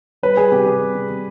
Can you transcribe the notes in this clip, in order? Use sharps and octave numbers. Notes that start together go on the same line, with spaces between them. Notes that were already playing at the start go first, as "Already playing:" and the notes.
G3 B4
G3 G#4
C3 G4
C3 G#4
G3
C3
C3